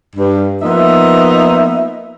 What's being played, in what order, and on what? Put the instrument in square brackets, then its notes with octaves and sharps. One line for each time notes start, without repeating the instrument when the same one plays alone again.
[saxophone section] G2
F3 A#3 B3 D#4 E5